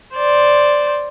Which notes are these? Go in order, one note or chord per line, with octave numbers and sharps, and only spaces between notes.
C5 D5